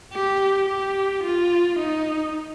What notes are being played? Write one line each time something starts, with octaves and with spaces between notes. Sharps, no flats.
G4
G4
F4
D#4